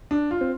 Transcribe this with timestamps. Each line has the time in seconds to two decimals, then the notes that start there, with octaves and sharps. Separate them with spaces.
0.11 D4
0.31 F4
0.41 C4